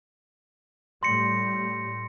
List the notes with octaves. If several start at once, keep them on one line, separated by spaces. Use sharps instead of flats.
A2 G3 C6 A#6 C#7